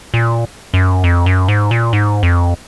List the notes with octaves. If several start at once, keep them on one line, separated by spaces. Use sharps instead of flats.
A#2
F#2
F2
F#2
G#2
A#2
G#2
F2